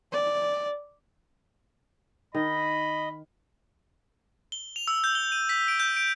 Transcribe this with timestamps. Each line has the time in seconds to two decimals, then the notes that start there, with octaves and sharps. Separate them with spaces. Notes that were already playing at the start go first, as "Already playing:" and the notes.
0.12 D5
2.35 D#3 D#5 B5
4.52 G7
4.76 F7
4.88 E6
5.04 G6
5.15 G7
5.32 D#7
5.49 B6
5.68 D7
5.80 G6
5.96 D7